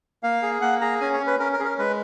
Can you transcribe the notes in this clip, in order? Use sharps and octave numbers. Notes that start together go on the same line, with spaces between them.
A#3 F5
G#4
A#3 F#5
G#4 A#5
C#4 G#5
C#5
C#4
B4
C#4 A#4
A#4
C#4 G#4
A#4
G#3 B4